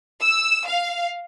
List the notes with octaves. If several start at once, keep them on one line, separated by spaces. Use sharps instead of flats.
E6
F5